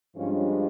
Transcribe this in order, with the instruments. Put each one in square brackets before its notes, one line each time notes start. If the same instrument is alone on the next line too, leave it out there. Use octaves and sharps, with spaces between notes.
[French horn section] G2 F3 G#3 C#4 F4